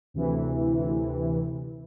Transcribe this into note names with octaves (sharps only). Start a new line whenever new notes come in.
D2 C3 E3